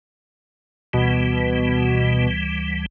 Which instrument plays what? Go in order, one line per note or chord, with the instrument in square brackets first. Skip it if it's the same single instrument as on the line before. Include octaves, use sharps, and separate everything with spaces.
[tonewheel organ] D2 E3 G3 [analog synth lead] B2